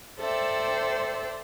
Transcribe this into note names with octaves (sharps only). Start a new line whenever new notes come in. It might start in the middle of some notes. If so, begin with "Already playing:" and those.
A4 C5 D5 E5 G5